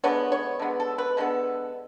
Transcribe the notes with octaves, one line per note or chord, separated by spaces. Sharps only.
D3 G#3 B3 C#5
C#5
D3 G#3 B3
A4
B4
D3 G#3 B3 A4